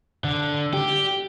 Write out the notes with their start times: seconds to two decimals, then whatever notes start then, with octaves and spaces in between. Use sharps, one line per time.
0.24 D3
0.73 G4